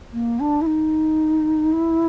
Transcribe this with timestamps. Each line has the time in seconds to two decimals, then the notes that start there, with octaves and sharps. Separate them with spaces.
0.12 A#3
0.39 D4
0.61 E4
0.66 D#4
1.72 E4